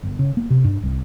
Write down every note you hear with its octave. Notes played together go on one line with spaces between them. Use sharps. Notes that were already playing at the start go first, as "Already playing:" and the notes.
G1
C#3
A#3
C3
G2
C2